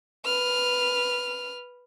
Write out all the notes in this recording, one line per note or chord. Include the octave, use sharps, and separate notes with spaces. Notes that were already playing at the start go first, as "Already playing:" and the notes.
B4 F6